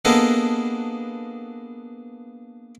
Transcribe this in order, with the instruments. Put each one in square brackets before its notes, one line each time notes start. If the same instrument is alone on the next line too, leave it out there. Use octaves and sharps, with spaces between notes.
[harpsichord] A#3 B3 D4 G#4 A4 D#5